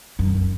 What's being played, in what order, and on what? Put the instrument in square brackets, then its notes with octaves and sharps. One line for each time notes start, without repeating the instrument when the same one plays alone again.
[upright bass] F#2